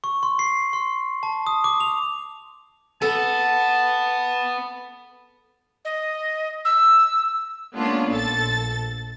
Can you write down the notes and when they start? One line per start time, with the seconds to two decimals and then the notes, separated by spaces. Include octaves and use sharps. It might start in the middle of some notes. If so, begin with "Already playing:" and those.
0.04 C#6
0.23 C6
0.39 C7
0.73 C6
1.23 A5
1.47 D#6
1.64 D6
1.80 F7
3.02 B3 A4 A5
5.85 D#5
6.65 E6
7.74 G#3 A#3 B3 C#4 D4 F4
8.10 A#1 A4 A6